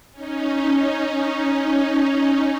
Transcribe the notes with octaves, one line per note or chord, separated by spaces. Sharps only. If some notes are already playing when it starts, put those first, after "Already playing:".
C#4 D#4